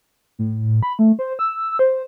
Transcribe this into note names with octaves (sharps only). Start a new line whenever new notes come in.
A2
B5
A3
C5
E6
C5